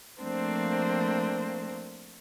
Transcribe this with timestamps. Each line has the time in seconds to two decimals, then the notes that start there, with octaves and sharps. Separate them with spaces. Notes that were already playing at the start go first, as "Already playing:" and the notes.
0.22 F3 A3 A#3 C4 D4 C5